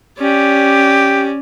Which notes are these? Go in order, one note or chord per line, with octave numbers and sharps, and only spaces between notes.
C#4 G4 D5